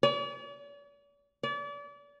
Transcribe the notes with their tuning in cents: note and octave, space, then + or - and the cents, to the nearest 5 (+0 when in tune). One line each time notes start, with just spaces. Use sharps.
D5 -45
D5 -35